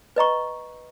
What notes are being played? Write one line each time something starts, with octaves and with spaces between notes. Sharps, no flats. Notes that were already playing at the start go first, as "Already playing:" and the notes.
B4 D#5 A#5 C#6